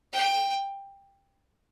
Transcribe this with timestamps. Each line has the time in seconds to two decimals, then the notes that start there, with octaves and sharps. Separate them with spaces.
0.12 G5